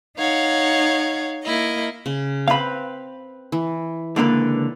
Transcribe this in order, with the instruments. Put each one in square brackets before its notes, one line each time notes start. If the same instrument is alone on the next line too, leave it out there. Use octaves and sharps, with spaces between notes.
[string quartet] D#4 C#5 F5 F#5
A#3 E4 D#5
[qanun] C#3
[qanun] C4 B4 [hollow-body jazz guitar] F5 B5
[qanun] E3
[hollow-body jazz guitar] C#2 D3 A#3 [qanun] B4 D5